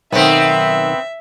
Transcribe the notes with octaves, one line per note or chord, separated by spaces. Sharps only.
B1 D#3 B3 C4 E5